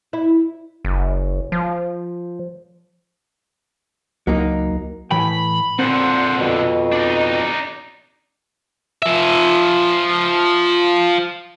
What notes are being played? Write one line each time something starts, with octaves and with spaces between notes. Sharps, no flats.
E4
F#1
F3
C#2 F#3 A#3 D#4
A2 E3 G5 B5
A#2 D3 C4 C5 F#5
F2 B2
D4 D#4
F3 E5